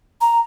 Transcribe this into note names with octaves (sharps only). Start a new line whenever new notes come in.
A#5